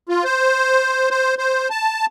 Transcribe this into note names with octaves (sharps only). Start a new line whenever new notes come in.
F4
C5
C5
C5
A5